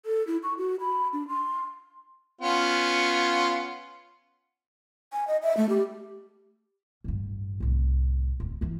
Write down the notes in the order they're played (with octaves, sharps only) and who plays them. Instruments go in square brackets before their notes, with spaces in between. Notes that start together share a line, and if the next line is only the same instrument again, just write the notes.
[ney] A4
E4
C#6
F#4
B5
D4
C6
[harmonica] B3 C#4 F4
[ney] G#5
D#5
E5
A3
G4
[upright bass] A1 G2
C2 A2
D1
F#2 E3